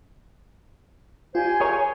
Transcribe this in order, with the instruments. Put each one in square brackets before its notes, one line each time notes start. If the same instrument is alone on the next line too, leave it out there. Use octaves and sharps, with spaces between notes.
[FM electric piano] F4 [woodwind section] G4 C5 G#5
[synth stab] G#4 A#4 C#5